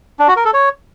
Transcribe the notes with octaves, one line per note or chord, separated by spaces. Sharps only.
D4
F#4
A#4
A4
C#5